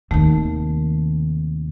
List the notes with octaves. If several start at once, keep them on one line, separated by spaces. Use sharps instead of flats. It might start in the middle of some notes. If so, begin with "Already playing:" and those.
D#2 C3 D#3 A3